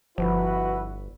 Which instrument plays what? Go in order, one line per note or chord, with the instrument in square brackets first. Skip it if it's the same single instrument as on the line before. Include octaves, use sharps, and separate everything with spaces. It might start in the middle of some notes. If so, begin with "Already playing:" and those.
[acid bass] G1 [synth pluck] F3 [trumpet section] E4 F#4 B4